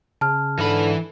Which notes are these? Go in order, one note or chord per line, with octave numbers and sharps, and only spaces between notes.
C#3 A5 F6
G#2 D3 E3 B5